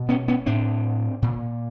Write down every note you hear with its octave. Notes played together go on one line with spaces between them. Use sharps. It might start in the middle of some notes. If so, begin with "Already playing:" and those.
Already playing: B2
B3 C#4
B3 C#4
A2 C4 D4
A#2